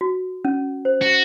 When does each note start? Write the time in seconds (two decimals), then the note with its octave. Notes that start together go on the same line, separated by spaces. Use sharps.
0.01 F#4
0.45 C#4
0.85 C5
1.01 F#4